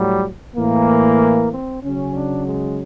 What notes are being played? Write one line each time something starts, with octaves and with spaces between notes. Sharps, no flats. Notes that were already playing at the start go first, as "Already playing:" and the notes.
Already playing: A2 F#3 G3
A2 E3 A#3
C4
C#3 F#3 C#4
D4
G#3